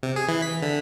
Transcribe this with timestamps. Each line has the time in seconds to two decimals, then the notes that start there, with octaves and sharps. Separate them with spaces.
0.03 C3
0.16 G#4
0.28 E3
0.42 B6
0.62 D3